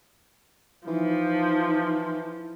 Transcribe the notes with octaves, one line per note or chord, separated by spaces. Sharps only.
E3 F3 D#4